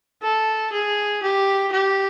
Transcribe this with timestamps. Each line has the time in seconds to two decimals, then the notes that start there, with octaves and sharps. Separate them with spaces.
0.22 A4
0.72 G#4
1.23 G4
1.72 G4